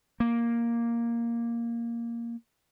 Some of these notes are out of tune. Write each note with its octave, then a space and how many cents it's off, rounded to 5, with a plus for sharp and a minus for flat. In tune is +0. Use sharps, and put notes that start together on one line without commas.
A#3 +0